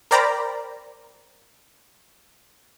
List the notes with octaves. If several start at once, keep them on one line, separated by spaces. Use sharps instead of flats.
A#4 C5 D5 G5 A#5 B5